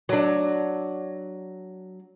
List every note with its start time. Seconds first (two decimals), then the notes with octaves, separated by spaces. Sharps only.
0.09 F#3 D4